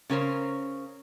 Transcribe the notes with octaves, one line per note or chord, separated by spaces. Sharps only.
C#3 C#4 A#4 C5